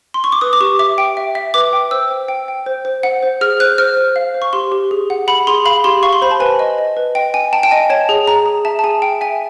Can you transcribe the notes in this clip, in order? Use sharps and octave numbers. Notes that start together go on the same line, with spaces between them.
C6
C#6
D6
B4 D#6
D6
G4 C#6
E5 D6
G5
E5
E5
B4 D6
G5
C5 E6
G5
G5
G5
C5
C5
F#5
C5
G#4 F6
C5 F#6
C5 F6
C5
F5
C5
C#6
G4 C6
G4
G#4
F#5
F#5 B5
G#4 C6
F5 B5
G4 C6
F5 C#6
C6
C5 B5
A5
B4 G#5
D#5
D#5
B4
D#5 G5
G5 G#5
G5 A5
G5
D#5 G#5
C#5 A5
G#4
G#4 A#5
G#4
E5 A5
A5
G#4 G#5
E5 G5
E5 G#5